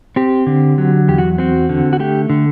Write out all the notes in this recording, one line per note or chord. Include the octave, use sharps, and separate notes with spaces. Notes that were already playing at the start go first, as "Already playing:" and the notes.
C4 G4
D3
F#3
E2 G4
F#4
C4 F#4
D3
F#4
A3 G4
D3